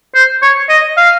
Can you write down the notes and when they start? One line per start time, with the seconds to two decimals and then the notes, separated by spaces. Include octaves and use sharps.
0.15 C5
0.42 C#5
0.69 D#5
0.97 F5